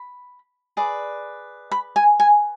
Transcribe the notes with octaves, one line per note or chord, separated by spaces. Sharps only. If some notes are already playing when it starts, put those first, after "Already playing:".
Already playing: B5
G#4 B4 D5
B5
G#5
G#5